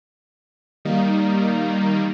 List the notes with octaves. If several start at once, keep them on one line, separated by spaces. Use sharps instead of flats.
D#3 G3 A#3 D#4